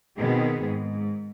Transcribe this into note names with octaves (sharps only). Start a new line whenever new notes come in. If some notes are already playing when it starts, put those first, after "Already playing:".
B2 D#3 B3 C4 G#4
G#2